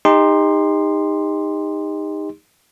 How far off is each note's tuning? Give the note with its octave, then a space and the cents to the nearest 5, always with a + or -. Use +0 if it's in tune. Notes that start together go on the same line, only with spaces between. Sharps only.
D#4 +0 G4 +40 C6 +0